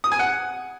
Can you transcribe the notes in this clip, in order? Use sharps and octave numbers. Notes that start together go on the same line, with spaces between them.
D#6
G#5
F#5